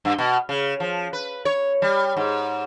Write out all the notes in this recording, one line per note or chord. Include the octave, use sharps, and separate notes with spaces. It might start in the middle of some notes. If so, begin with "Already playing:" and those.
G2
B2
C#3
F3
B4
C#5
G3
G#2